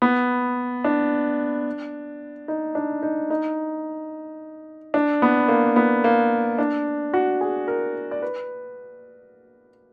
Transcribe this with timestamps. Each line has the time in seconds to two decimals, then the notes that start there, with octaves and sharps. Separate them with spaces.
0.02 B3
0.84 D4
2.48 D#4
2.75 D4
3.02 D#4
3.30 D#4
4.94 D4
5.22 B3
5.48 A#3
5.76 B3
6.04 A#3
6.58 D4
7.14 F#4
7.41 G#4
7.68 A#4
8.11 D5
8.22 B4